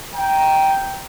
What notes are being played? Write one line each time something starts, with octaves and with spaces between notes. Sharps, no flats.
G5 A#5